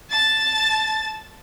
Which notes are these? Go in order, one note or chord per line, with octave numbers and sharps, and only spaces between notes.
A5 A6